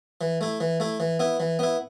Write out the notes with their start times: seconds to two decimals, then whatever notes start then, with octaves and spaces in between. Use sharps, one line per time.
0.21 E3
0.41 A3 E4
0.60 E3
0.80 A3 E4
1.00 E3
1.19 B3 E4
1.40 E3
1.59 B3 E4